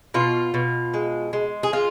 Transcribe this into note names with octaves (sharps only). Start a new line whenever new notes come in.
B2 F4
B2
G#3
G#3
G#4
G#3 F4